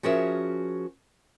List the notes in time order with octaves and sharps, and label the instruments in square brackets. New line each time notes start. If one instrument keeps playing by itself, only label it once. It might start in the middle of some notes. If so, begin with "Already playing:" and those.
[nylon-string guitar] F3 C#4 F#4 G#4 A#4 E5